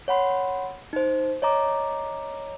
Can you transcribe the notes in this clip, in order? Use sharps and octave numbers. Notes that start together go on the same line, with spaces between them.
C#5 F#5 B5 C6
D#4 C5
C#5 D#5 A#5 D6